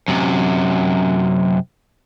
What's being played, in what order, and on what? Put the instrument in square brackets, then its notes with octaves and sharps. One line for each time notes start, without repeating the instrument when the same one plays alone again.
[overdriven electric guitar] F#2 C3